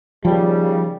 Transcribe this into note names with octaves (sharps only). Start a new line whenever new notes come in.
D#2 C#3 F3 G3